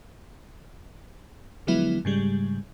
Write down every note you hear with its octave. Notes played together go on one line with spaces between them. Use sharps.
D3 F3 F#3 G#3 B3 E4
G#2 C#3 G3 G#3